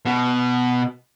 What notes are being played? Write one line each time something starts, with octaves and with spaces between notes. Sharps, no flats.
B2